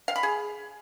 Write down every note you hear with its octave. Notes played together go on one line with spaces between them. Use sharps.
F5
B5
G#4